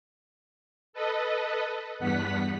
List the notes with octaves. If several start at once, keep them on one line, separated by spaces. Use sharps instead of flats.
A4 B4 D#5
E2 G2 B3 F#5 B6